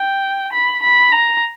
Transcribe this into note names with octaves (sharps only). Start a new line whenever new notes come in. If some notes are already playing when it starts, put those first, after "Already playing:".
Already playing: G5
B5
B5
A#5